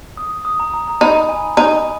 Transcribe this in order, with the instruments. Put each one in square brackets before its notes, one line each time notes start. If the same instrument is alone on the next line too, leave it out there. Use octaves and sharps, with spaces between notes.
[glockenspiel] D#6
D#6
A#5
A#5
A#5
[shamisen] D#4 [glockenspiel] B5
[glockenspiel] G#5
[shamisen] D#4 [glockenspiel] A#5